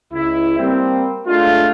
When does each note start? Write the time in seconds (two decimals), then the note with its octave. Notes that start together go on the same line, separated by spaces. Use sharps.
0.12 C#2 E4
0.58 G3 A#3 C4
1.27 G#3 A3 D4 F4